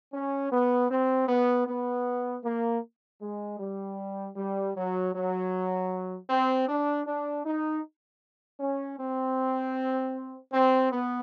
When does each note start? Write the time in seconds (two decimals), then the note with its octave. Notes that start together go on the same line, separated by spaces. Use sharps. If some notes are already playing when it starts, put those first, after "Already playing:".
0.13 C#4
0.52 B3
0.90 C4
1.29 B3
1.67 B3
2.44 A#3
3.21 G#3
3.59 G3
4.36 G3
4.75 F#3
5.13 F#3
6.30 C4
6.68 D4
7.06 D4
7.45 D#4
8.60 C#4
8.99 C4
10.53 C4
10.92 B3